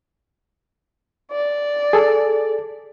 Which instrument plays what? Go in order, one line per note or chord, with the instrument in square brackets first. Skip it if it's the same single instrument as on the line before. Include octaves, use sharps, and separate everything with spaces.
[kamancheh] D5
[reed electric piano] G#4 A4